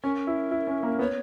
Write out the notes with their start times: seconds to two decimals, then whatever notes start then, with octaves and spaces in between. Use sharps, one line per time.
0.03 C#4 A#4
0.27 E4
0.51 E4
0.67 C#4
0.83 A#3
0.99 B3 C#5